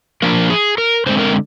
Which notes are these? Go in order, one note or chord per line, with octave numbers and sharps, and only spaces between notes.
F3 A#3 D4 A#4
G#4
A#4
D3 G#3 C4 C5
A#4